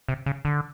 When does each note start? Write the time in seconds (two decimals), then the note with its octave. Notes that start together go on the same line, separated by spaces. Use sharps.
0.08 C3
0.26 C#3
0.45 D3